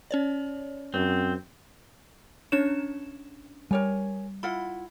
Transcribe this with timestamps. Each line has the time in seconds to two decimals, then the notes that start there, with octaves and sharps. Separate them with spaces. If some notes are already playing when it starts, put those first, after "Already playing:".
0.11 C#4 C#5 D5
0.94 F#2 C4
2.52 C#4 D4 C#5 E7
3.71 G3 A#4 C#5 G#5
4.43 E4 F4 F#5 B5